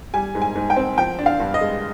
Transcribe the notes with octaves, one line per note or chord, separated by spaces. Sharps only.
G3 G#5
G#2
G#5
G#2
G5
C4
F3 G5
D4
F5
G2
D#5
G#3